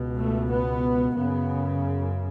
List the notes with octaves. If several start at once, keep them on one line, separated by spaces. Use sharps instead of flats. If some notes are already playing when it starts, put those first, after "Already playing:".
Already playing: C#2 B2
A3
B3
F#2 C#3 B3